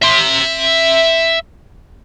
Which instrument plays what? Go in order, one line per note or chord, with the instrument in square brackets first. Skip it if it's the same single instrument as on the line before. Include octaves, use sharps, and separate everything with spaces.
[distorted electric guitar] E5 C6